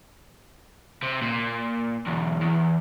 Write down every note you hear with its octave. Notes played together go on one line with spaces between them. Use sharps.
C3
A#2
B1 E2
E2